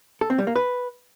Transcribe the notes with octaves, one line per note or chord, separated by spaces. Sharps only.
A4
C4
G3
A#3
B4